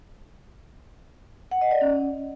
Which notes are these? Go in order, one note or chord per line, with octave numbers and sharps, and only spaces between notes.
F#5
D#5
D5
C#4